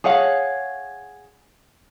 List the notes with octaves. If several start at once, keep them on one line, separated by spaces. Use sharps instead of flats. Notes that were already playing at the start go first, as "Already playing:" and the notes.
G#4 C#5 F5 F#5